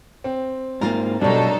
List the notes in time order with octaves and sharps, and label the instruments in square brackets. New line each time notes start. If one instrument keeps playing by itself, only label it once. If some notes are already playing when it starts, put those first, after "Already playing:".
[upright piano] C4
[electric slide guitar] G#2 A#3 [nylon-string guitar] F4 A#4
[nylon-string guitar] B2 G3 [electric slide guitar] F#3 D4 [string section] D#4 A4